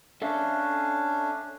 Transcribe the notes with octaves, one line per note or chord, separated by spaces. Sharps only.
C#4 D4 A4 E5 F5